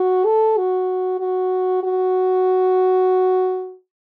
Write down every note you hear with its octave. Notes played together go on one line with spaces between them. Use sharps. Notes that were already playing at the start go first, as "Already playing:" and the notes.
Already playing: F#4
A4
F#4
F#4
F#4